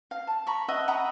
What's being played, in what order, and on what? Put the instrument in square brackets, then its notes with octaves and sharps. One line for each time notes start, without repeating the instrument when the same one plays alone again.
[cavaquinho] F5
A5
A#5 B5 C#6
D#5 E5 F#5 B5
F#5 A#5 B5 D#6